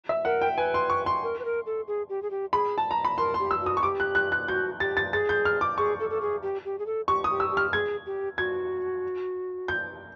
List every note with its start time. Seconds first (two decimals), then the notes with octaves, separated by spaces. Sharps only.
0.09 E5
0.25 A#4 F#5
0.41 G5
0.57 B4 G#5
0.74 C6
0.90 C#6
1.06 C6
1.23 A#4
1.39 B4
1.45 A#4
1.66 A4
1.87 G#4
2.09 G4
2.22 G#4
2.31 G4
2.53 G#4 B5
2.78 A5
2.91 A#5
3.05 B5
3.18 A#4 C6
3.34 C6
3.40 G4
3.51 E6
3.62 F#4 D#6
3.77 C#6
3.83 G4 D6
4.00 F#6
4.15 F#6
4.32 F#6
4.48 F#4 G6
4.80 G4 A6
4.97 A6
5.12 G#4 A6
5.29 G6
5.45 F6
5.61 D6
5.78 G#4 C#6
6.00 A4
6.10 A4
6.21 G#4
6.43 G4
6.65 G4
6.79 G#4
6.86 A4
7.08 G4 C#6
7.24 D#6
7.30 G4
7.40 E6
7.51 G4
7.57 F6
7.73 G#4 G#6
8.06 G4
8.38 F#4 G#6
9.68 G6